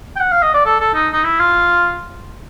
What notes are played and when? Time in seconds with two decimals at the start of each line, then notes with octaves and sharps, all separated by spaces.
0.16 G5
0.20 F#5
0.32 F5
0.43 D#5
0.54 D5
0.66 A4
0.80 A4
0.94 D#4
1.13 D#4
1.24 E4
1.40 F4